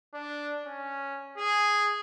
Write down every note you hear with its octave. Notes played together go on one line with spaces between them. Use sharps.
D4
C#4
G#4